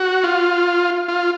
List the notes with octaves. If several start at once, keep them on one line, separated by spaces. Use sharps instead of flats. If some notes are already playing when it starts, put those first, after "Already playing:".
Already playing: F#4
F4
F4